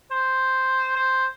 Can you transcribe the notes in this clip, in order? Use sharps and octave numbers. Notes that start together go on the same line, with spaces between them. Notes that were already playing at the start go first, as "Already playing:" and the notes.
C5
C5